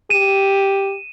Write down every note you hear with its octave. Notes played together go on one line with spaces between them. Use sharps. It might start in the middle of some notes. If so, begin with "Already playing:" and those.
G4 D#7 E7